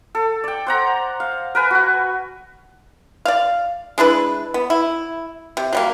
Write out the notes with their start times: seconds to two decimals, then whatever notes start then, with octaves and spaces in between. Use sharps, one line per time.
0.15 A4
0.44 D5 G5
0.66 C5 F#5 A#5
1.20 F5
1.55 A#4 B4 G#5
1.71 F#4 B4
3.25 D5 F5
3.98 G#3 D4 E4 B4
4.54 B3
4.70 E4
5.57 C3
5.73 F#3 G3 A#3